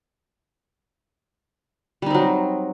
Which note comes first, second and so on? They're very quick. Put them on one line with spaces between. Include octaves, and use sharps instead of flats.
G3 D#4 C4 F#3